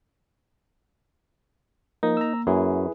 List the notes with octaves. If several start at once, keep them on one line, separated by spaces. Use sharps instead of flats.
F3 A#3 D#4
A#5 E6
F#2 E4 G#4 B4